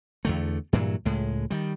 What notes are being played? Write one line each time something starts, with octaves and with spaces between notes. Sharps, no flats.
E2 D3 A3
G2 A#2 E3 F#3
C#2 A2 G#3
D#3 G3